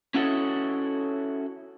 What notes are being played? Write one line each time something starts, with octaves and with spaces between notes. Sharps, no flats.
C#4 E4 F#4 A4 C#5 D#5